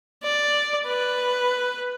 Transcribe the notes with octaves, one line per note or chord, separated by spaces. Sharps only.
D5
B4